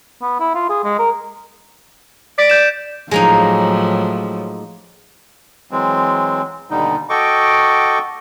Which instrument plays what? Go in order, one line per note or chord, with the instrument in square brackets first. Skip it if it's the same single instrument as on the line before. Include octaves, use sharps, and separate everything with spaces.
[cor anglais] B3
E4
F4
G#4
G#3
A#4
[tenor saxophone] D5 [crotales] B6
[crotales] G6 E7
[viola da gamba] A2 F3 F#3 [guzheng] G#3 A#3 D#4
[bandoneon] E3 F#3 G#3 C4
D#2 B2 D3 G3 D#4
F#4 A4 D#5 G5 C#6 D6